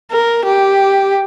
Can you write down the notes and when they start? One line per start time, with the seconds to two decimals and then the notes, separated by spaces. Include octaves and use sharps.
0.12 A#4
0.45 G4